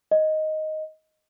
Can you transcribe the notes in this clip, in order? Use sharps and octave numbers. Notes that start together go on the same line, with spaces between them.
D#5